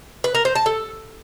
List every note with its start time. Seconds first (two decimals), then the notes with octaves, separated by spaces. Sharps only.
0.24 B4
0.35 A#4
0.45 C5
0.55 A5
0.66 A4